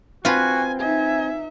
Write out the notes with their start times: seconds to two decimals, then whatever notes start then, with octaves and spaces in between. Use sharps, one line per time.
0.25 C4 F4 F#4 B4 G#5
0.80 D#4 E5 G#5